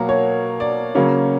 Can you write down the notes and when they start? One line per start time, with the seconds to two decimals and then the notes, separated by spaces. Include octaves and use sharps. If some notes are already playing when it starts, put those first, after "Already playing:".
Already playing: B2 F#3 A#3 A#4
0.09 C#5
0.60 D5
0.95 C#3 F#3 A#3 C#4